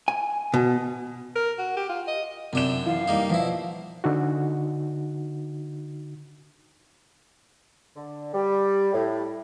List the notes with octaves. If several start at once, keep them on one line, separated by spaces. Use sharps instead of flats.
G#5
B2
A#4
F#4
G4
F4
D#5
F#2 C3 D4 G5 E7
E3 F5
G3 A#3 D#4
B2 F3 E4
D3 D#4 F#4
D3
G3
A2